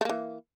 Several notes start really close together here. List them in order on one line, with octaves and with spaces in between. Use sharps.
A3 A#3 E3